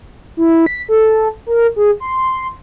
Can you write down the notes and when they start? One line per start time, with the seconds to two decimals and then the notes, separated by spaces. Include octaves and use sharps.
0.37 E4
0.66 B6
0.89 A4
1.46 A#4
1.76 G#4
2.00 C6